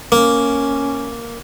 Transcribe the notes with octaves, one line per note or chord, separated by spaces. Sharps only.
A#3 C#4